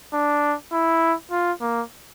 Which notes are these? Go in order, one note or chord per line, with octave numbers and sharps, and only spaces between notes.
D4
E4
F4
A#3